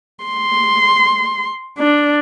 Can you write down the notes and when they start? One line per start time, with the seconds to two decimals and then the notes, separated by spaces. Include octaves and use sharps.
0.25 C6
1.78 D4